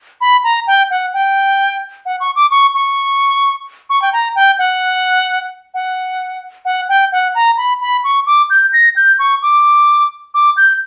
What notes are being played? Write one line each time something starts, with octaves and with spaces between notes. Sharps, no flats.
B5
A#5
G5
F#5
G5
F#5
C#6
D6
C#6
C#6
C#6
G5
A#5
G5
F#5
F#5
F#5
G5
F#5
A#5
B5
B5
C#6
D6
G6
A#6
G6
C#6
D6
D6
G6